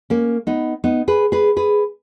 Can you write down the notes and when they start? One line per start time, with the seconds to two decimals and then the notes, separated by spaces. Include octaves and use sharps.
0.10 A#3 C#4
0.47 B3 D#4
0.84 B3 D#4
1.08 G#4 B4
1.32 G#4 B4
1.56 G#4 B4